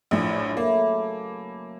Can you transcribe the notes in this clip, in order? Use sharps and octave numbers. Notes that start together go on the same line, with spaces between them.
A#1 F#2 A2 C#3 B4
A3 A#3 E4 D#5